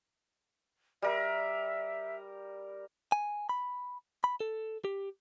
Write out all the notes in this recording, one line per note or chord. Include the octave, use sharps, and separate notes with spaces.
G3 A#4 E5
G#5
B5
B5
A4
G4